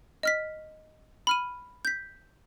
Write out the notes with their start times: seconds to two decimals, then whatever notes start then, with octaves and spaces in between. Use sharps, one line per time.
0.23 D#5 F6 B6
1.27 B5 F6 D#7
1.85 G6 B6